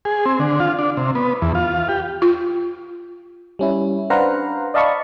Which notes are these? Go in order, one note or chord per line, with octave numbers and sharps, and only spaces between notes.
G#4
C4
D3
F4
D4
C3
B3
E2
F4
G4
F4
G3 C#4 E4
D4 B4 C5 F5 F#5 A#5
D5 D#5 F5 A5 B5 C#6